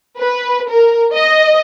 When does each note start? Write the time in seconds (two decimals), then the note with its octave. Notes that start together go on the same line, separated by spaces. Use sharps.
0.18 B4
0.69 A#4
1.14 D#5